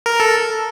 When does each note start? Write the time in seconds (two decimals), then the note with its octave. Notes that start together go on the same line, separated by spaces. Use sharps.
0.06 A#4
0.20 A4